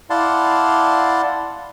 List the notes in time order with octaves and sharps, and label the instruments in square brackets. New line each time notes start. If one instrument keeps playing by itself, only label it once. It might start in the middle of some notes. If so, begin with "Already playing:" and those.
[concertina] E4 D5 F5 F#5 A5 C6